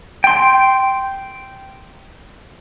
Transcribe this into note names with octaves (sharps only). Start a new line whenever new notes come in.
G5 C6